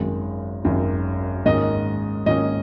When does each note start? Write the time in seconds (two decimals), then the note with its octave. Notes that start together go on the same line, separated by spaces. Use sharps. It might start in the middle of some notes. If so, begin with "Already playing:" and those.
Already playing: G#1 F#2 D#3 G#3
0.65 G#1 F#2 D#3 G#3
1.46 G#2 D#3 A#3 C#4 D#5
2.26 G#2 D#3 A#3 C#4 D#5